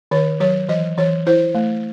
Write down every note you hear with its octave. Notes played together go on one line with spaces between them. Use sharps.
D#3 C#5
F#3 C#5
E3 D#5
E3 C#5
E4 C5
A3